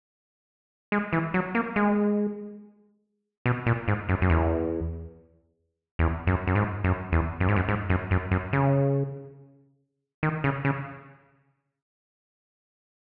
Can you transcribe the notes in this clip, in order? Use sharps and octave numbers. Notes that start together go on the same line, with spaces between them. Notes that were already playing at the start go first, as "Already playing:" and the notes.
G#3
E3
F#3
A#3
G#3
B2
A#2
G#2
F#2
F#2
E2
E2
F#2
F#2
G#2
F#2
E2
F#2
G#2
F#2
G#2
F#2
F#2
F#2
C#3
D#3
C#3
C#3